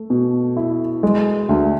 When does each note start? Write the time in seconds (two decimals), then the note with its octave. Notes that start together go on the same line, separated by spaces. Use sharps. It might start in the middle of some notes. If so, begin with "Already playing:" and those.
Already playing: A3
0.10 B2
0.57 E4
1.03 G#3
1.49 D2